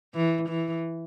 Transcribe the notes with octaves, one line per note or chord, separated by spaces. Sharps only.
E3
E3